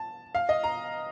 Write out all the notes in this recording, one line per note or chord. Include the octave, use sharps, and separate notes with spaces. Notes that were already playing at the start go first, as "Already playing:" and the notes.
Already playing: A5
F5
D#5
A#5